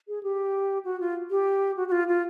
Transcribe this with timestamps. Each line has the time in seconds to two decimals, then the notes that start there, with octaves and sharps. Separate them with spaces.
0.08 G#4
0.23 G4
0.85 F#4
1.00 F4
1.30 G4
1.77 F#4
1.88 F#4
1.92 F4
2.08 F4